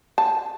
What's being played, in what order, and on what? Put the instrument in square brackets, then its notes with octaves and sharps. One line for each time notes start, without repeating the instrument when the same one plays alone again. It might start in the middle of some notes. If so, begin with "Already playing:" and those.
[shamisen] A5